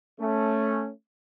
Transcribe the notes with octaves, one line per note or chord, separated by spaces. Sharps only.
A3 C#4